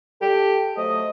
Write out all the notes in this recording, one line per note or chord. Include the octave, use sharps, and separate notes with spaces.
G4 A4
F#3 A3 C5 D#5